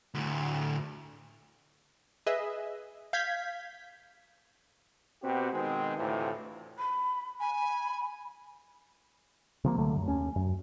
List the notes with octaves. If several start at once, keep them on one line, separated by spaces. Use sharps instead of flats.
D2 A2
G#4 B4 D#5 E5
F5 G6 G#6 B6
B2 C4 F#4 G4
B2 D#3 G#3 C4
D2 A2 C3 E3 F4
B5
G#5 B5
C3 F3 A#3
C#2 D3 F#3 A3
F#2
D#2 C#4
F#2